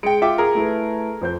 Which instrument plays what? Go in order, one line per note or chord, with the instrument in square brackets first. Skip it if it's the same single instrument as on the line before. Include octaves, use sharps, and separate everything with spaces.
[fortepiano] G#3 G5 [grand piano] C#7 D7
[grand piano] F4 [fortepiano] E5 G5 D6
[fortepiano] G#4 A#4
[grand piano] A3 E4 B4
F2 C5 G6